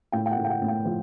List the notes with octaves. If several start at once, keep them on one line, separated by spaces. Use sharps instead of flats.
A2 G5
G5
F#5
A2
G5
F#5
A2
G5
F3